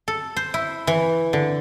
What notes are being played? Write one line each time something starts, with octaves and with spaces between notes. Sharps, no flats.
A4
C5
E4
E3
D3